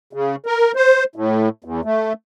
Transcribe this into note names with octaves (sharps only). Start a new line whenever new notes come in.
C#3
A#4
C5
A2
E2
A3